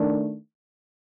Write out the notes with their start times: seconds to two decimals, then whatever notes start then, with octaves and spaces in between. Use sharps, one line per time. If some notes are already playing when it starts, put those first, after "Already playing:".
Already playing: D#3 A3 D4